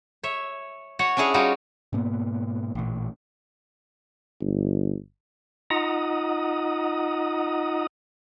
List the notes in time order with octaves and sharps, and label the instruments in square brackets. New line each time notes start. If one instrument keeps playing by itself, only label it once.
[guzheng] C#5 E5
F#4 C#5 F#5
C#4 D4 E4 G#4 C#5
G3 D#4 F4 F#4 F#5
[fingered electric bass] G#2 B2 A#3 B3
A1 A#2
[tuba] G1
[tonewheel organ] D#4 F4 D#5 F#5 A#5 D#6